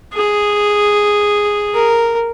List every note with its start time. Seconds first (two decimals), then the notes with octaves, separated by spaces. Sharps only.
0.13 G#4
1.74 A#4